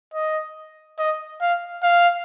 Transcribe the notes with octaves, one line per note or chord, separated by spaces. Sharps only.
D#5
D#5
F5
F5